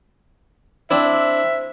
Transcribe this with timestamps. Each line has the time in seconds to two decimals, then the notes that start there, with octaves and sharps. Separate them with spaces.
0.91 C4 D4 E4 C5 E5